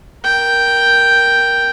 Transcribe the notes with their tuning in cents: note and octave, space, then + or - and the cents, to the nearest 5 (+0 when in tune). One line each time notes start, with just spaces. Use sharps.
A#4 +10 G5 +0